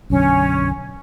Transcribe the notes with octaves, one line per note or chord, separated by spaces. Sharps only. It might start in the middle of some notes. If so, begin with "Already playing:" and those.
B1 F#2 D3 C#4